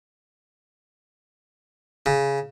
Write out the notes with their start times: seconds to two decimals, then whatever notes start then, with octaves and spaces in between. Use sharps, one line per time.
2.06 C#3